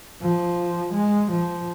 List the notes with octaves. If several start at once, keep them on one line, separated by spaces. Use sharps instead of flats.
F3
G#3
F3